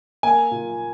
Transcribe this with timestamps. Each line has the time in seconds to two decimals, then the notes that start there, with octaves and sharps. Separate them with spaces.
0.23 A#3 G#5
0.51 A#2